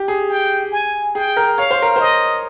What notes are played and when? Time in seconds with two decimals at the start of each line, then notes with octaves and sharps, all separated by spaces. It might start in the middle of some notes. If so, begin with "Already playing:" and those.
Already playing: G4
0.08 G#4
0.29 G5
0.72 G#5
1.15 G#4 G5
1.37 A#4
1.58 C#5 F5
1.71 C5
1.82 A#4
1.96 C5 D#5